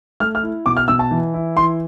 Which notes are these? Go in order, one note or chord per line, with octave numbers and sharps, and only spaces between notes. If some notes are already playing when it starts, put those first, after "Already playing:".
A3 F6
F6
E4
B2 D6
F6
B2 E6
A5
E3
E4
E3 C6